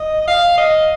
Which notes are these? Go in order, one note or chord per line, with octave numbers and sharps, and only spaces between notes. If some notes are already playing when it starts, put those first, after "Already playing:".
Already playing: D#5
F5
D#5